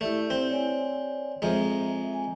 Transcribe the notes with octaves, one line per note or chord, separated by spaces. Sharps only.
A3 E4 G4 D5
C4
C#5 D5 G#5
F2 G#3 E5 A#5
G#5